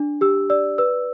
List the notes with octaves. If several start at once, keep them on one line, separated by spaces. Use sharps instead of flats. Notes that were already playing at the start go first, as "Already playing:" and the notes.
Already playing: D4
G4 E6
D5 E6
B4 E6